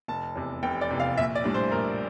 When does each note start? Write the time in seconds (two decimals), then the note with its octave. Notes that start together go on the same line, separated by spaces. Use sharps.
0.08 F1 A5
0.35 E2 C3
0.63 F1 G5
0.81 D5
0.91 E2 C3
1.00 F5
1.17 A#1 E5
1.35 D5
1.44 A2 G3 D4
1.54 C5
1.72 A#1 A#4